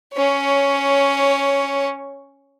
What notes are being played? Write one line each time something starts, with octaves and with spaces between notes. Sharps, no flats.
C#4 C#5